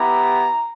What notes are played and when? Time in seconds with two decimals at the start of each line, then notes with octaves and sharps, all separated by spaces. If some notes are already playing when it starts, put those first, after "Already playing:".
Already playing: B3 E4 G4 A#5